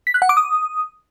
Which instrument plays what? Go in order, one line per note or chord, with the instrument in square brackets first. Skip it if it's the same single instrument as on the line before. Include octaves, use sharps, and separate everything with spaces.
[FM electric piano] B6
F#6
F#5
D6
D#6